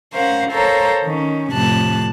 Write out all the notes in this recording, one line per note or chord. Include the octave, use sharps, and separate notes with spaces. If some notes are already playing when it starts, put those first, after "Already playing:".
C#4 A#4 C5 F5 F#5
A4 A#4 C5 C#5 F5 A#5
D#3 C#4
F2 A2 C3 A5 F#6